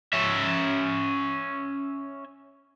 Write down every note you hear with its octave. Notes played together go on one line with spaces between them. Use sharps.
C#4 E5